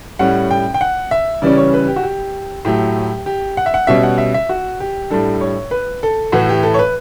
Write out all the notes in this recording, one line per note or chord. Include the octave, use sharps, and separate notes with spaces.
A2 G3 C#4 F#5
G5
G5
F#5
E5
C#3 E3 G3 C#4 D5
C#5
B4
G4
F#4
G4
A2 F#3 A3 G4
G4
F#5
E5
F#5
B2 G3 C#4 E5
F#5
E5
E5
F#4
G4
A2 G3 D4 A4
C#5
B4
A4
A2 E3 A3 F#4
G4
A4
C#5
B4